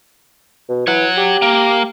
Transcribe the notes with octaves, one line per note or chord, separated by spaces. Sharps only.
B2
E3 C#5 F#5
G4
A#3